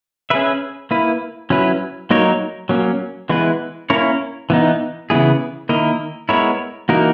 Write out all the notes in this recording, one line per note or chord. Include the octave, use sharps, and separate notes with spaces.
C#4 G#4 B4 E5
A#3 E4 B4
F#3 C#4 E4 B4
F#3 A#3 D#4 A#4 C#5
F#3 A#3 C#4
E3 G#3 B3 E4 B4
A#3 C#4 E4 A#4 C#5
E3 B3 D#4
C#3 E3 B3 E4 G#4
D#3 A#3 E4 A#4 D#5
G#3 B3 E4 A#4 C#5
E3 A#3 D#4 F#4 A#4